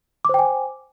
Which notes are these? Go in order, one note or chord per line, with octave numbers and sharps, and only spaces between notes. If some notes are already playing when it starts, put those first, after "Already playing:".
C5 G5 G#5 D6